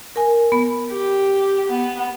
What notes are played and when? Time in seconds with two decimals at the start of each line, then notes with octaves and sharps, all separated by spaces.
0.16 A#4 G#5
0.52 B3 B5
0.92 G4
1.69 B3